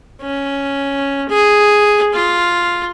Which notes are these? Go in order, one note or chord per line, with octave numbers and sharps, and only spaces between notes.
C#4
G#4
F4